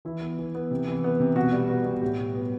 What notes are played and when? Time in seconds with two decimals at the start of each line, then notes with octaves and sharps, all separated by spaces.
0.05 E3 E4
0.21 B3
0.39 E3
0.55 B3
0.71 C3
0.88 E3
1.04 B3
1.20 C3
1.36 B2 F#4
1.52 G3
1.69 B3 F#4
1.85 B2
2.02 A2 G4
2.18 G3
2.34 B3